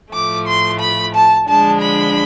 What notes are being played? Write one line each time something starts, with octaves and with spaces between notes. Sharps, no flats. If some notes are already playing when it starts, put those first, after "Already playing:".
A2 F3 A3 D6
C6
B5
A5
D3 F3 G#3 D4 A5
B5